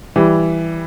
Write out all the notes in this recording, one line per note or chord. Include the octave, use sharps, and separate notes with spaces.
E3 G3